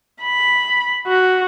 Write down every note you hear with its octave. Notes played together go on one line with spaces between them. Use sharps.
B5
F#4